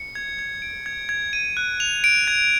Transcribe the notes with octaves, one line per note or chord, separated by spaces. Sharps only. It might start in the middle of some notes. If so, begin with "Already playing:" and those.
Already playing: C#7
G#6
G#6
D7
G#6
G#6
D#7
F#6
F7
D7
G#6